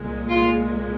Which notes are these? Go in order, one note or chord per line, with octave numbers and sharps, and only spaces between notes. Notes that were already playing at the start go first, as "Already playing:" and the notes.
Already playing: C2 A#2 G#3
F4